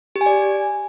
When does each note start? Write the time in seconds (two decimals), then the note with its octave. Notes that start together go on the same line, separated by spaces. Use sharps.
0.16 G4
0.21 G#5
0.26 D5